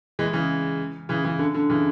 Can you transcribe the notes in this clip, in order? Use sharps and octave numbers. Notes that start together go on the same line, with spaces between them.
E3 G#3
C#3 E3
C#3 E3
C#3 E3
D3
D3
C#3 E3